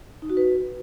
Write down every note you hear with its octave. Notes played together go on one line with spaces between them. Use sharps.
D#4
F#4
B4